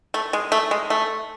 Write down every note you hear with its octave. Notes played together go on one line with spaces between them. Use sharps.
A3
G#3
A3
G#3
A3